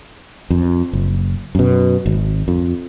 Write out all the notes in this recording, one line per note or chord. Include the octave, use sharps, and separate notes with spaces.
F2
F#1
F#2 B2
G#1
F2